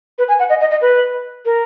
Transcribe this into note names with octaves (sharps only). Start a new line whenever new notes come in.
B4
G#5
F#5
D#5
D#5
D#5
B4
A#4